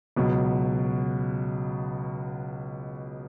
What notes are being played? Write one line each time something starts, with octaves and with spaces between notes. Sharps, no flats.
C#2 B2 F#3